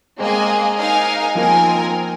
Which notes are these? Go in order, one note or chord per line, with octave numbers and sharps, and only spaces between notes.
G#3 A#3 C4 G#4 D#5 G#5
D#4 A#4 F5 G#5
F3 A#3 C4 D#4 A#4 G#5